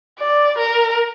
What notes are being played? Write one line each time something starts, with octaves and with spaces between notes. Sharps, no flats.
D5
A#4